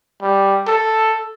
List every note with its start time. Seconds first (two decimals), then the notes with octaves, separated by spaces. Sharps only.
0.22 G3
0.68 A4